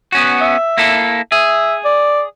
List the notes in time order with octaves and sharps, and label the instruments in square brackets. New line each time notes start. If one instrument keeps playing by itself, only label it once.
[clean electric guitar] B3 C#4 F#4
[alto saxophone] E5
[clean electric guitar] A#3 E4 A4
[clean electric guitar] G#4 [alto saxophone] E5
[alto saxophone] D5